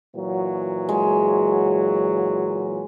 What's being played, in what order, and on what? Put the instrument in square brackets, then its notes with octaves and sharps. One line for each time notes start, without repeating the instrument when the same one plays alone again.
[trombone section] A#2 E3 F#3
[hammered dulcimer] G#3